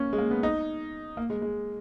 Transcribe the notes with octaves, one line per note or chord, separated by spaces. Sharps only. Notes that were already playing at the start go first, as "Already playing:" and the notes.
Already playing: A#3 C#4
G#3
A#3
B3
D#4
A#3
G#3
G#3